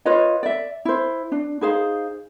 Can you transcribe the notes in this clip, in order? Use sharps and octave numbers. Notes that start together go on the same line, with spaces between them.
F4 B4 C#5 D#5
D5 E5
E4 C5
D4
D#4 G#4 C5 F5